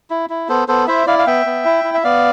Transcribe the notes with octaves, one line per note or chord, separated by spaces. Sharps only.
E4
E4
B3 A4 C5
B3 A4 C5
E4 C5 E5
E4 D5 F5
F5
B3 E5 G5
B3
E4
E4
E5
B3 D5 F5